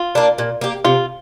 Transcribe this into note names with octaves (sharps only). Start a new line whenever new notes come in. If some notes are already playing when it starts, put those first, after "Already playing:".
Already playing: F4
A#3 D4
A#2
A#3 G4
C3 F4